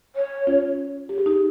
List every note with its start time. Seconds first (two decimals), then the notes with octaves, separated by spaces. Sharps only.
0.16 C#5
0.47 C#4 F4
1.09 G4
1.18 G#4
1.26 D#4 G4